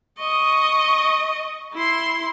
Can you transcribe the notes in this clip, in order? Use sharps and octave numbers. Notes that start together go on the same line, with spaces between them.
D#5 C#6 D#6
E4 C6